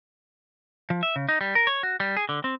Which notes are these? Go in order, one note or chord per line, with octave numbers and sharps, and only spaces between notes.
F3
E5
C#3
D#4
G3
A#4
C#5
F#4
G3
G#4
D3
C4